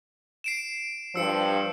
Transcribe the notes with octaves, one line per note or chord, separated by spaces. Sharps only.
C7 D7 E7
G2 F3 E6 C#7